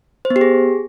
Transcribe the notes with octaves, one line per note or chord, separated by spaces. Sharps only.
C5
B3
G4
G#4